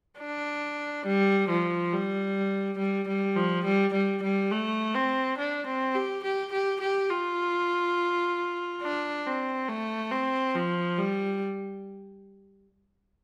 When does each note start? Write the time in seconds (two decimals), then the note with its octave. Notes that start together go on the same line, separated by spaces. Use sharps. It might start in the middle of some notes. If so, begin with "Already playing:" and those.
0.20 D4
1.06 G3
1.49 F3
1.93 G3
2.78 G3
3.08 G3
3.36 F3
3.65 G3
3.94 G3
4.23 G3
4.51 A3
4.95 C4
5.38 D4
5.67 C4
5.95 G4
6.24 G4
6.52 G4
6.81 G4
7.11 F4
8.83 D4
9.26 C4
9.68 A3
10.12 C4
10.55 F3
10.98 G3